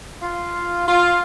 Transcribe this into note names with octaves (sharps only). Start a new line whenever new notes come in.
F4
F4